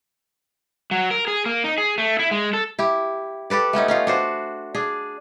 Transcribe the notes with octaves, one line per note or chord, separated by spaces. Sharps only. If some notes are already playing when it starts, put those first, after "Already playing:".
F#3
A#4
G#4
A#3
D#4
G#4
A3
E4
G#3
A4
E4 G4
G4 A4 B4 D5
A3 B3 C#4 D#4
C#4 D#4 F4
D4 F#4 C5
D4 G#4